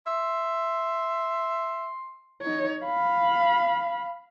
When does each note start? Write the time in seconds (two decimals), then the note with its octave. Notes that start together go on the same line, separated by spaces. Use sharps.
0.07 E5 C6
2.42 D#4 C#5
2.85 F5 B5